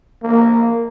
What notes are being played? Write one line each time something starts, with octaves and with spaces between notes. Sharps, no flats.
A#3